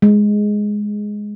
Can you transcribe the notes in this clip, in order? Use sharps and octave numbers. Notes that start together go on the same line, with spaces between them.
G#3